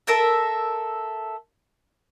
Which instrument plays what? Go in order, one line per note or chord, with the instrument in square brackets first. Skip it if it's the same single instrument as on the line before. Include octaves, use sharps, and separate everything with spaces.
[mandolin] A4 A#4 E5